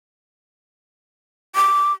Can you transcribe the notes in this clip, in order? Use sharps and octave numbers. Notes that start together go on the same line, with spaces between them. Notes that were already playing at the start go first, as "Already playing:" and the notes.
D6